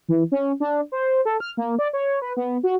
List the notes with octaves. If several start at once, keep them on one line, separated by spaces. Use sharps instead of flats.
E3
C#4
D4
C5
A4
F6
A#3
D5
C#5
B4
B3
F#4